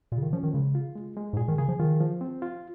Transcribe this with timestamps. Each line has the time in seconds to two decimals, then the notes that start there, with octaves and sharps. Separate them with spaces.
0.12 A#2 F4
0.18 C#3
0.22 D#3
0.33 F3 C#4
0.43 D#3
0.53 C#3 G#3
0.75 F4
0.96 G#3
1.16 G#3
1.33 G#2
1.37 A#2 G#4
1.48 D#3
1.58 C#3 G#4
1.68 F3
1.80 D#3 F4
2.00 F3
2.21 C4
2.42 F4